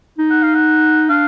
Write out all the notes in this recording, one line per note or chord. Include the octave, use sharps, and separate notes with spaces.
D#4
F#5
F5
F#5
D4 F5